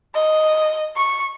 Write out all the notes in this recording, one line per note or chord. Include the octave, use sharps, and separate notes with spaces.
D#5
C#6